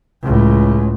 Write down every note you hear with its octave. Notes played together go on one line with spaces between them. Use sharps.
C#2 A2